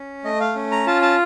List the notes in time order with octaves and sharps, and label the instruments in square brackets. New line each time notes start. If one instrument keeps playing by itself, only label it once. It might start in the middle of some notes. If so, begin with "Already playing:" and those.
Already playing: [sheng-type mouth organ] C#4
A3 D#5
F5
C#4
A#5
F4 A5
A5